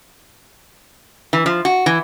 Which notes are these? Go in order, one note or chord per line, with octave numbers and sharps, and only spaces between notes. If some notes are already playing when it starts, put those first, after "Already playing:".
E3
F3
F#4
E3